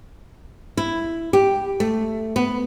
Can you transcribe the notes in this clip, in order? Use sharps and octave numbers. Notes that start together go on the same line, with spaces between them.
E4
G4
A3
B3